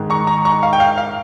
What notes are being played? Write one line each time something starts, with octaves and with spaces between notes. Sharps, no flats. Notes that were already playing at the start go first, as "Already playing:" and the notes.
Already playing: G#2 D#3 G#3
A#5 C#6
A#5 C#6
A#5 C#6
F5
G5
F5
F5